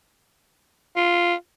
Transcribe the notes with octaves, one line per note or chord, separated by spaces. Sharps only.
F4